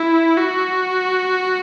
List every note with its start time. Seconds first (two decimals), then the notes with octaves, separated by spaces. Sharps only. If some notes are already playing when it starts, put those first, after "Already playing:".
Already playing: E4
0.38 F#4